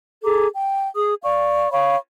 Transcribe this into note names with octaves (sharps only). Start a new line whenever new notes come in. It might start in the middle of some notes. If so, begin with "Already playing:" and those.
G#4 A4 A#5 D6
G5
G#4 D#6
D5 F5 C#6
C#5 F5 B5 C#6